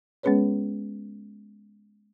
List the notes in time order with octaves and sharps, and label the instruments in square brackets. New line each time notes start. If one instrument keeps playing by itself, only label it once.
[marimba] G#3 B3 C#4 G#4 B4 C#5